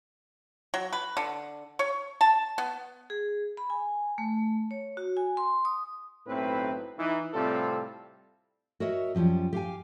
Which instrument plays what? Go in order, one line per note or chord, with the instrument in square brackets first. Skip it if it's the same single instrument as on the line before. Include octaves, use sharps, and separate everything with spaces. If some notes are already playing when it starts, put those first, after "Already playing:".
[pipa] F#3
B4
D3
C#5
A5
B3
[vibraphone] G#4
B5
G#5
A3
C#5
F#4
G#5
C6
D#6
[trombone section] B1 A2 C4 E4 B4
E3 D#4
A2 C3 G3 C4 F4 A4
[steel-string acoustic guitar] F#4 A#4 C#5 D#5 E5
F#2 F3 G3 C#4
G4 F5 G#5